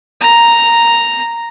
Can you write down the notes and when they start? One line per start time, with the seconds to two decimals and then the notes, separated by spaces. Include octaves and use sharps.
0.21 A#5